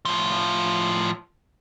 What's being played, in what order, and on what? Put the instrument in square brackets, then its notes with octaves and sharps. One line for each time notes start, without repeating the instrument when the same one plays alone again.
[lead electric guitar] A2 F3